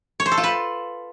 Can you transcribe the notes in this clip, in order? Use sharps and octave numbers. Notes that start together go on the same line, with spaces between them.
C#5
C5
A4
F4
B4